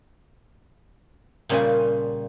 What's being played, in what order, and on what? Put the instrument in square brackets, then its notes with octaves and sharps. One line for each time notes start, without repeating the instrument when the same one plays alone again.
[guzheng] A#2 C#3 G3 A#3 F4 G#5